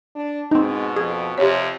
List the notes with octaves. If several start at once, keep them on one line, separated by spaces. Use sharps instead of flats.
D4
G#2 B2 C4 D#4
F2 G#4
F2 C3 G4 C#5